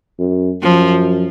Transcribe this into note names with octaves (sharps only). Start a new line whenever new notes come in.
F#2
F#2 F3